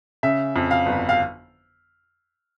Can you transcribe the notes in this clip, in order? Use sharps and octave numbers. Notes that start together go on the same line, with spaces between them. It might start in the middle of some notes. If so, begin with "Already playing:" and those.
C#3 E5
F2
F5
G1
F5